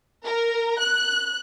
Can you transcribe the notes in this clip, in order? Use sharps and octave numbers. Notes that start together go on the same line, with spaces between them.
A#4
F#6